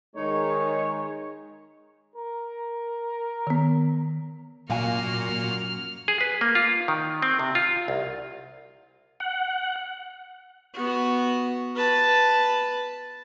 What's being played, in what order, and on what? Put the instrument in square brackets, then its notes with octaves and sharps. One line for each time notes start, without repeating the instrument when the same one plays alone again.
[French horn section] D#3 G#3 [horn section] D#4 C#5
[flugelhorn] A#4
[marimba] D#3 B3
[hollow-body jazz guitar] F#2 F5 G#5 [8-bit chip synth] A#2 [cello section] A#3 F#4 [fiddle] F6
[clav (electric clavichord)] G#4
B4
A#3
F4
D#3
C4
C3
F4
C2
[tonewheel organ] F#5
[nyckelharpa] B3 F#4
B4 A5